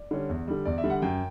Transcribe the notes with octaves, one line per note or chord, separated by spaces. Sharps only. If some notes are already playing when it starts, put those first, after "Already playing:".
Already playing: D5
D3 G3 C#4
E2
D3 G3
E2 D5
E5
D3 G3
F#5
F#2 G5